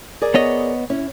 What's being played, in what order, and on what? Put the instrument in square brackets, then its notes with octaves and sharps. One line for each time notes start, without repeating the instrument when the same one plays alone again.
[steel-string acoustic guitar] G#4 A#4 D5
[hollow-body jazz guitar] B3 C#5 D#5
[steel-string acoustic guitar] C#4 E4